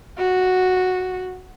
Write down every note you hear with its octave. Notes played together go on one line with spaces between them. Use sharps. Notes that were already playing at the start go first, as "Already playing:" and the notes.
F#4